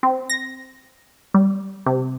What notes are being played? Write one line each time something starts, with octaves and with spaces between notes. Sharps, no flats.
C4
A#6
G3
C3